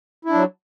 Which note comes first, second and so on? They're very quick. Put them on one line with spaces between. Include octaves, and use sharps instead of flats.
E4 D4 F#3